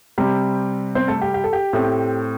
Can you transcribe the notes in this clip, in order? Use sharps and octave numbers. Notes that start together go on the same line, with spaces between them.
C3 G3 C4 G4
C4 C5
A3 A4
G4
G4
A4
G4
A2 A3 C4